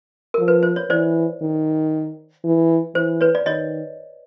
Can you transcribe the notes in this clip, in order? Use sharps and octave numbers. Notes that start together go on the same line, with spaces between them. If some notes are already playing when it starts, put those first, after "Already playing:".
F3 A#4
B4
C5
C#5
E3 C5 D5
D#3
E3
E3 C5
B4 C#5
D5
D#3 C#5 D#5